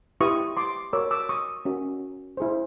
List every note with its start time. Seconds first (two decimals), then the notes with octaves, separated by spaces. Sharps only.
0.20 E4 G4 B4 C#6 D#6
0.57 C6 D6
0.93 F#4 A#4 C#5 D6 E6
1.11 D6 E6
1.29 C#6 D#6
1.65 C#4 F#4 A#4
2.37 E4 G#4 C5